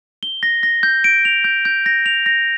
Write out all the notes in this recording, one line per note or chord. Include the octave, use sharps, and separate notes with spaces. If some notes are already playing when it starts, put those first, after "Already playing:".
G7
A#6
A#6
G6
D7
F7
G6
G6
A#6
F7
A#6